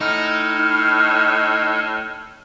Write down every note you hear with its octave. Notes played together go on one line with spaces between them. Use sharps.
A2 D#4 F6